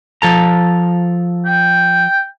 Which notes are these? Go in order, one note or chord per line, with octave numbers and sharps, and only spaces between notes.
F3 A4 A#5
G5